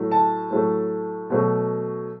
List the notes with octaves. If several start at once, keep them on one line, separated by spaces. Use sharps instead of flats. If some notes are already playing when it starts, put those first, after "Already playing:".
Already playing: A2 F#3 A3
A5
A2 F#3 A3
B2 F#3 A3